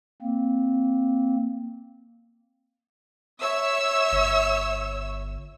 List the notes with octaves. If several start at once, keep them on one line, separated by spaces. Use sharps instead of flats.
A#3 C4
C#5 E5 E6
G1